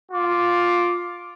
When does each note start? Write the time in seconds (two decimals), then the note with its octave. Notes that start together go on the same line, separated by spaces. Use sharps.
0.11 F4 D6